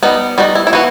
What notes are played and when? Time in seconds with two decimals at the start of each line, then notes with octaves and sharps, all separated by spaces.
0.03 G3 B3 D#4
0.38 G3 B3 D#4 F#4
0.55 E4
0.67 E4
0.73 E3 B3 F#4